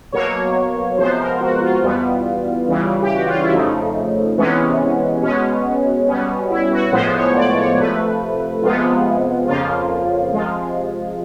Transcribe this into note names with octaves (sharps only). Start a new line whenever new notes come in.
B2 F#3 A#3 C#5
C3 F3 G#3 B3 C5
A#4
F#4
F4
E2 B2 G3 B3
C#3 E3 G3
G4
F#4
F4
E4
F2 C#3 F3 A3 D#4
C3 E3 G#3 B3 C#4
B2 G#3 B3 C#4
B2 G3 B3 C#4
E4
F#4
A2 F3 G#3 B3 C5
C#5
D5
C#5
C3 F3 A3 B4
C3 F3 G#3 B3 F4
F2 C#3 F3 A#3 F4
C3 F3 G#3 F4